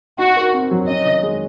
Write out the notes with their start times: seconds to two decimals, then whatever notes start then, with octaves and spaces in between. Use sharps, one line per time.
0.18 D#4 F#4
0.37 A#4
0.53 C4
0.71 F#3
0.88 C#4 D#5
1.05 D#3
1.23 G#3